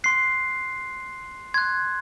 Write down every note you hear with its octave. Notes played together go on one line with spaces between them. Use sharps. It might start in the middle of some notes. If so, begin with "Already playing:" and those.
C6 F#6 C7
C6 F#6 G#6